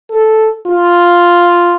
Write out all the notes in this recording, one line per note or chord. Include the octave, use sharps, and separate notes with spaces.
A4
F4